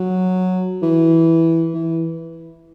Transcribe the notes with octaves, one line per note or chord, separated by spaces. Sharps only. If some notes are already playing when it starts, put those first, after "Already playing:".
Already playing: F#3
E3
E3